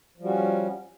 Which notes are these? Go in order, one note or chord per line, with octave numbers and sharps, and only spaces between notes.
F3 G3 C#4 F#4